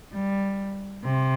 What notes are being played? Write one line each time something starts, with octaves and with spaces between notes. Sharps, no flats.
G3
C3